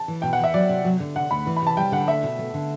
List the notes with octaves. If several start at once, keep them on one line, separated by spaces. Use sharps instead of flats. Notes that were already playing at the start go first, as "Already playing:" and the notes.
Already playing: A5
E3
B2 G5
F#5
E2 E5
F#3 D5
C3
F#3
D3
C3 F#5
D2 B5
E3
B5
C3 A5
G3 G5
D3 F#5
A3 E5
B2
A3
D3